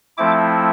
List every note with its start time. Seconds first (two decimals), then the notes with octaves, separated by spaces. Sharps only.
0.17 F3 A3 C4 E4 D6